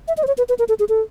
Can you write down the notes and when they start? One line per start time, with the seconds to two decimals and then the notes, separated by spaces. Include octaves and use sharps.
0.08 E5
0.17 D#5
0.23 C5
0.27 C#5
0.38 B4
0.49 B4
0.59 A#4
0.69 A4
0.79 G#4
0.89 A4